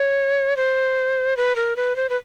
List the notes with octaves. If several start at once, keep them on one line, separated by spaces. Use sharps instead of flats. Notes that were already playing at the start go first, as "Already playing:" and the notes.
Already playing: C#5
C5
B4
A#4
B4
C5
B4